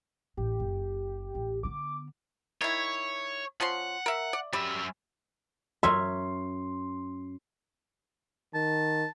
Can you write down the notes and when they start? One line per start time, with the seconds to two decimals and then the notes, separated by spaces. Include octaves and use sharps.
0.37 A1 G4
0.60 F#1
1.35 A1
1.63 D3 B3 D6
2.61 D#3 E4 C#5
3.60 F3 C#4 F#5 C6
4.06 A#4 E5
4.33 D5
4.53 F#2 G3 E5
5.83 F#2 C#4 E5 C6
8.54 D#3 A5